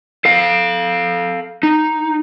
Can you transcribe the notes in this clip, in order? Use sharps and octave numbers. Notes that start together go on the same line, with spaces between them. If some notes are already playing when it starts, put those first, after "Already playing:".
A4 F5
D#4